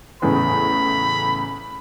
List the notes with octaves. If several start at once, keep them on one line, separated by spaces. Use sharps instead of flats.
E2 A2 C#3 B5